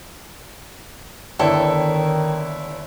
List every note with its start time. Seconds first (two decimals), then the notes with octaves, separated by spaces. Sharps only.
1.39 G1 D#3 E4 A4 C#5 D5 G5